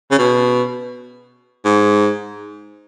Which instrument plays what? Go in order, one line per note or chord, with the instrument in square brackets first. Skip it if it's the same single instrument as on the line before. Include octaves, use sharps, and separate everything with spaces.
[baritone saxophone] C#3
B2
G#2